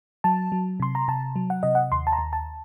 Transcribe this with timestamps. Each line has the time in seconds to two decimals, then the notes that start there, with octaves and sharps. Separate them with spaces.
0.24 F#3 A5
0.52 F#3
0.80 C3 C6
0.95 A#5
1.08 C3 A5
1.36 F#3
1.50 F#5
1.63 C3 D#5
1.75 F#5
1.92 D#2 C6
2.07 A5
2.13 A#5
2.19 D#2
2.33 A5